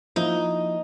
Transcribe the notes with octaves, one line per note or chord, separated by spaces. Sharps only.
F3 A#3 D#4 E4